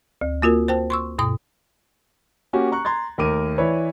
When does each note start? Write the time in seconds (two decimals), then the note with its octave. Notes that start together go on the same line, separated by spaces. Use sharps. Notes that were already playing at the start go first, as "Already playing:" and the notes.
0.21 D2
0.42 A#3 F4 F#4 A#4
0.68 C5 G5 A5
0.90 C6 C#6 E6
1.19 G2 B2 D#6
2.53 A#3 C#4 F#4 G4
2.72 A#5 C#6 F#6
2.85 A#5 C6 G#6 A6
3.18 D#2 A3 A#4 D6 D#7
3.58 E3 E4 B4 C#5 D5